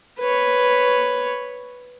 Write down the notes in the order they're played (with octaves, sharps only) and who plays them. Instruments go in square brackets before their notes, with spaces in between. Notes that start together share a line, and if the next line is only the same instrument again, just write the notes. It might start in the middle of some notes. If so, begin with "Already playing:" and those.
[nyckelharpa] B4 C#5